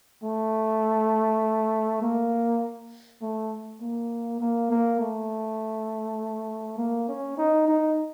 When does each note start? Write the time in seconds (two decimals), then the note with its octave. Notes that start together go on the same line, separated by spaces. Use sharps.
0.24 A3
2.02 A#3
3.21 A3
3.81 A#3
4.40 A#3
4.70 A#3
5.00 A3
6.78 A#3
7.08 C#4
7.37 D#4
7.67 D#4